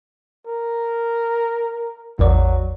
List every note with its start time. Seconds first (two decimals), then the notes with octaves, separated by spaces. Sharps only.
0.47 A#4
2.19 A1 E2 F#3 D5